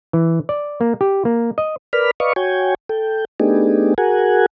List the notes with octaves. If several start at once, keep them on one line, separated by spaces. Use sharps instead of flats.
E3
D5
A#3
G4
A#3
D#5
A#4 B4 D5 B5 F6
B4 D5 D#5 F5 C#6
F#4 C#5 G5 G#5
A4 G5
A3 B3 D4 D#4 G4 G#4
F#4 G#4 A#4 F#5 G#5